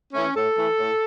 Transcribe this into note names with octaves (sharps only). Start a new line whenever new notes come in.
E3 A3 C#4
A2 A4
E3 A3
A2